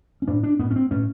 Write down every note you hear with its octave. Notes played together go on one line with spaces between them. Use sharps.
C#4
A2 D4
D4
A2 B3
C#4
C4
A2 C#4